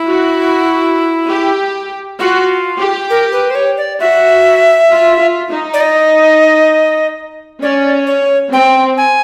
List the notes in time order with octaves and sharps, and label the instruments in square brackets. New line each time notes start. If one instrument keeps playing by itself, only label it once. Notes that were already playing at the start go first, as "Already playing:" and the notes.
Already playing: [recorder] E4
[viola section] F#4
G4
[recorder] F4 [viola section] F#4
[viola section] G4
[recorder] A#4
B4
C5
C#5
D5
[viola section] F#4 [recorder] E5
[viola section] F4
F4
D#4
[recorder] D5
D#5
[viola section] C#4 [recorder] D5
[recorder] C#5
[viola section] C4 [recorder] G5
[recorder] G#5